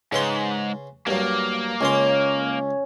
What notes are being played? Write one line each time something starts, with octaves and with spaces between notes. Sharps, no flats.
G#2 C#3 B4 C6
G2 F#3 A#3
C#2 C#3 C#4 C6